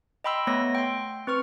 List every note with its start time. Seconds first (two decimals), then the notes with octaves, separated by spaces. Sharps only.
0.24 D#5 G5 B5 C6 E6
0.47 A3 B3 C#5 A#6
0.75 G5 C6
1.27 C4 B4 C#6 F6